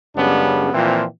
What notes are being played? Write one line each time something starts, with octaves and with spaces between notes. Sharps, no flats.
F#2 C#3 G3 G#3 B3 D4
A#2 E3 F3 C4